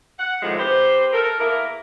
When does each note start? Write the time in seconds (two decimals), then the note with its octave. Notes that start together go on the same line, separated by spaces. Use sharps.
0.19 F#5
0.42 A2 C3 D#3 F3 G#3 A3
0.58 C4 G4 B4 C5
1.13 A4 A#4
1.39 E2 A#3 E4 A#4